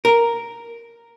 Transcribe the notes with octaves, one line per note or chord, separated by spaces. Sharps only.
A#4